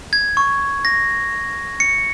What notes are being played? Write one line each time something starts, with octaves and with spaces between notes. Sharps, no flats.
G#6
C#6
A#6
C#7